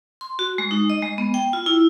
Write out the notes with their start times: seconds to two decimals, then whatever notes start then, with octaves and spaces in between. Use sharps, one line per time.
0.21 C6
0.39 F#4
0.58 G#3
0.71 D#4
0.90 D#5
1.02 G#3
1.18 B3
1.34 G5
1.53 F4
1.66 E4